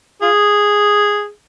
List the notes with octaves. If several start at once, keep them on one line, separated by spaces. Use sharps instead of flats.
F4 G#4